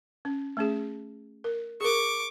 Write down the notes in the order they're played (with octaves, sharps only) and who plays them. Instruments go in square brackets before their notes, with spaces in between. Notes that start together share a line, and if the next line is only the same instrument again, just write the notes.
[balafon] C#4
A3 C#4 G#4
A#4
[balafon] G#4 A#4 [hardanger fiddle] C#6 D6